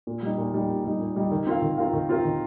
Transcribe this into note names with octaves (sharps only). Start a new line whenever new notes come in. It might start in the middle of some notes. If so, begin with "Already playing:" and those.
A#2
G3 D#4
A#2
G3 D#4
A#2
G3 D#4
A#2
G3 D#4
D#3
C4 F4 A#4 F5
D#3
C4 F4 A#4 F5
D#3
C4 F4 A#4 F5
D#3